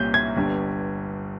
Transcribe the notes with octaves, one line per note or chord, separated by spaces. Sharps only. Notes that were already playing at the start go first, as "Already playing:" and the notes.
Already playing: C2 A#2 G3 A#3 C#4 G6
G#6
G1 G2 G3